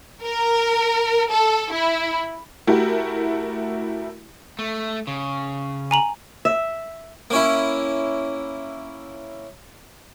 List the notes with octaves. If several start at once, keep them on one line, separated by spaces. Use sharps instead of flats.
A#4
A4
E4
A3 E4 F#4 G4 A#4
A3
C#3
G#5 A#5 F#7
E5
A#3 C#4 E4